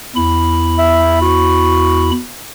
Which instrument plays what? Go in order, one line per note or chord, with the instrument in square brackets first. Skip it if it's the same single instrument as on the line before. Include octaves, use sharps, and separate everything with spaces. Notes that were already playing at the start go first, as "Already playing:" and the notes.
[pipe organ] E2 E4 B5
[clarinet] E5
F#4